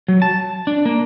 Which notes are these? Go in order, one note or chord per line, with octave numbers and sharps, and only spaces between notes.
F#3
A5
D4
A#3